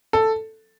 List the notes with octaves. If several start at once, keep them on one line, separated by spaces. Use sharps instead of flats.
A4